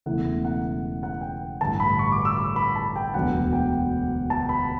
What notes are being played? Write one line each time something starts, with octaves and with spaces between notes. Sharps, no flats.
E1 E2 C#3 E3 A3 F#5
F#5
F#5
G5
A1 G2 D3 A3 A5
B5
C#6
D6
E6
D6
B5
A5
G5
E1 D2 D3 F#3 B3 F#5
G5
A5
B5